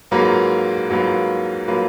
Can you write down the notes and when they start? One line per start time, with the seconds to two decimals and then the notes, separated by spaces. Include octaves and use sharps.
0.11 G#2 F#3 A#3 F4 B4
0.90 G#2 F#3 A#3 F4 B4
1.68 F#3 A#3 F4 B4